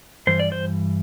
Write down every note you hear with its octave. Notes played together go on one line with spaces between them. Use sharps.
G2 E3 C5
D5
C5